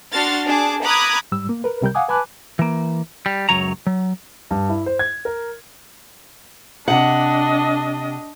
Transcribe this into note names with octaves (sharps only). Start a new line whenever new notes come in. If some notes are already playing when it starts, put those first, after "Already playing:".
D4 F#4 C6 F6 A6
D4 G#4 A5 D6
A#5 B5 D6 D#6 F#6 G#6
G#2 G3 E6
A#3
A#4 B4
C2 C3 G3 A#4 G6
F5 F#5 G#5 D6 D#6
B4 G#5 A5 B5 D6 F#6
E3 A#3
G3
C#2 F#2 F#3 C#5 A#5
F#3
G2
E4
C5
G#6
A#4
C3 D4 D#5 F#5